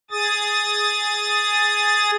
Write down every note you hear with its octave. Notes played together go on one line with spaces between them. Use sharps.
G#4 D#6 A6